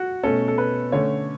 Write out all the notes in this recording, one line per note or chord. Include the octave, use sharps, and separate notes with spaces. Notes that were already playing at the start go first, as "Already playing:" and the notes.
Already playing: F#4
B2 A3 C#4 A4
A4
B4
D3 A3 C#4 C#5